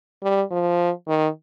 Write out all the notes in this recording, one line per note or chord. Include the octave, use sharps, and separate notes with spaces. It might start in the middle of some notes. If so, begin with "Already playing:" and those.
G3
F3
D#3